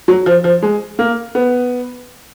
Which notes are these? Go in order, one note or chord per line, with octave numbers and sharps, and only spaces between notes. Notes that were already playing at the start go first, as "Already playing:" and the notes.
F#3
F3
F3
G#3
A#3
B3